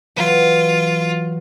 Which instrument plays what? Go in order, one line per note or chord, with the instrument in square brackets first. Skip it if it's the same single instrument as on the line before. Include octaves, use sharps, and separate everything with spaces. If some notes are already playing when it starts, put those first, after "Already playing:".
[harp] E3 F#3 [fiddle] F4